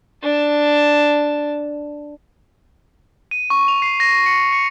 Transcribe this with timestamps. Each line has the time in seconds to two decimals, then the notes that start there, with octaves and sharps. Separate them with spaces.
0.23 D4 A5
3.31 D#7
3.50 C#6
3.68 F7
3.82 C7
4.00 A#6
4.26 C#7
4.52 C#7